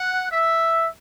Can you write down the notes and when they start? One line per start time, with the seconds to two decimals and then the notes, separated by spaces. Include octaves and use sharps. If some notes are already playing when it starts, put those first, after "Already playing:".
Already playing: F#5
0.32 E5